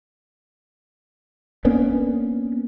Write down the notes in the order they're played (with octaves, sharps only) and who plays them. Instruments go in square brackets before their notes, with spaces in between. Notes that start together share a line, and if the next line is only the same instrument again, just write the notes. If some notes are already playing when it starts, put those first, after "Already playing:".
[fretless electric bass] A#3 B3 C#4 D4